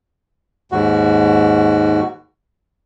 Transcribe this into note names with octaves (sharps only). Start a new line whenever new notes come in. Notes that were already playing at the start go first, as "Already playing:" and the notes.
D#2 G#2 F#4